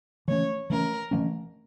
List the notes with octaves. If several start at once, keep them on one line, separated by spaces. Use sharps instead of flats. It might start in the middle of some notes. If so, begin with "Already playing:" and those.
E3 A3 C#4 C#5
E3 A3 C#4 A#4
E3 A3 C#4